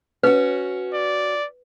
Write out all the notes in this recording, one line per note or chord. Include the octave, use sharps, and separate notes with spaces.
C#4 F#4 B4
D5